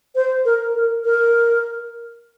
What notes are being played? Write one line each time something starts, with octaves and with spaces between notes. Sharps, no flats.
C5
A#4
A#4
A#4